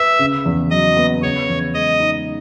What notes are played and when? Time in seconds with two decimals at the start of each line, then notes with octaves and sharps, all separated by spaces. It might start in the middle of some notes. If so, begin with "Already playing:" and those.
Already playing: B4 E5
0.19 C#3
0.45 E2
0.71 F#3 D#5
0.97 B3
1.22 C#3 C#5
1.48 E2
1.74 G#3 D#5
2.00 D#4